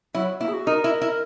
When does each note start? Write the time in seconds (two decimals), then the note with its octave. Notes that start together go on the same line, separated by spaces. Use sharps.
0.14 F#3 E4
0.40 A#3 E4
0.48 G#4
0.53 F#4
0.67 D#4 A#4
0.84 E4
1.01 E4